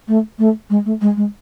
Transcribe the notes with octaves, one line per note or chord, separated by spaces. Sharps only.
A3
A3
G#3
A3
G#3
G#3